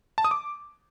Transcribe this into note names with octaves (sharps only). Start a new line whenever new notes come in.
A5
D#6
D6